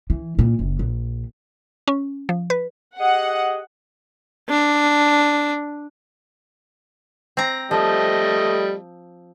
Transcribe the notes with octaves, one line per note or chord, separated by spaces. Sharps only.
E3
A#2
F#1
A#1
C#4
F3
B4
G4 G#4 D#5 F#5
D4
C4 A#5
F3 G3 A3 D#5